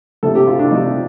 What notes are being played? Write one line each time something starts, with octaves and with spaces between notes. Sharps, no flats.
C3 F3 A3 A4
G4
F4
D4
C3 F3 A3 D#4